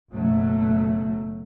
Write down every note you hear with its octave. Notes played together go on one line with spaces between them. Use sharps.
F#1 B2 F#3 A3